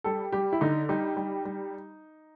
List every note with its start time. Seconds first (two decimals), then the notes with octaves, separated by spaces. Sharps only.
0.04 G3 A4
0.32 G3 G4
0.53 E4
0.61 D3 D#4
0.89 G3 D#4
1.17 G3
1.45 G3